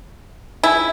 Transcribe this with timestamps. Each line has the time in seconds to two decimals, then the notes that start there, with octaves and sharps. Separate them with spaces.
0.63 E4 G#4